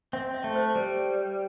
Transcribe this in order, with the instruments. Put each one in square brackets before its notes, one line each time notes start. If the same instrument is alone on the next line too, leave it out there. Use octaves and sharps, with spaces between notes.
[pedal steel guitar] C4 [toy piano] E5
[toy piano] E5
[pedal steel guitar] A3
[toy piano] C5
[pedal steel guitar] G3 [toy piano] C5